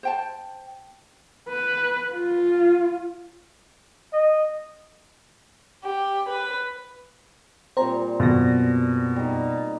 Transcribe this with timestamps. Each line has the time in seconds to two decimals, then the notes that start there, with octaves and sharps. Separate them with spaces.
0.03 C5 G5 A5
1.49 B4
2.13 F4
4.13 D#5
5.84 G4
6.28 B4
7.77 A#2 G3 C4 C5 A#5
8.20 F#2 B2 A#6
9.16 G3 D#4